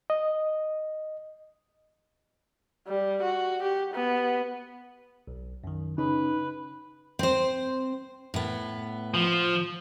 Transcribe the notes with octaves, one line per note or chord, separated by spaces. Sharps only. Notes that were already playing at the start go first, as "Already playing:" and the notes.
D#5
G3
F#4
G4
B3
B1
F#2 D#3
C#3 C#4 D#4 B4
C4 C5
A2 B3
F3